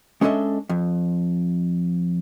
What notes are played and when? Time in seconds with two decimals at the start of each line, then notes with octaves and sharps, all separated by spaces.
0.21 G#3 C#4 D4 A4 D#5 E5
0.69 F2